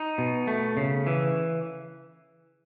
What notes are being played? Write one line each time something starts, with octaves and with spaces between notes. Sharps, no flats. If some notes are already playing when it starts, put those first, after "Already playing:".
Already playing: D#4
B2
A3
C#3
E3